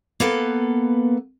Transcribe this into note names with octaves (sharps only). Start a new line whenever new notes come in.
A#3 B3 A4 B4